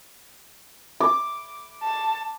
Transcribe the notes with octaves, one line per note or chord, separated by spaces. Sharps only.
D6
A5